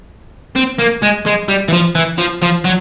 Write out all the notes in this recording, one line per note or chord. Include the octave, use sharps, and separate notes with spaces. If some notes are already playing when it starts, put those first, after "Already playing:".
C4
A#3
G#3
G#3
G3
E3
F3
E3
F3
F3
F#3